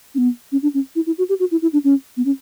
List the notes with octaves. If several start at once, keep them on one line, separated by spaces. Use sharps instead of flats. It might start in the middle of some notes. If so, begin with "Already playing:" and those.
C#4
B3
C#4
D4
C#4
E4
E4
F#4
G4
F#4
E4
E4
D4
C#4
B3
C#4